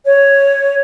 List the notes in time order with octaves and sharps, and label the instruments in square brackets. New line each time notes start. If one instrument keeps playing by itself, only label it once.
[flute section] C#5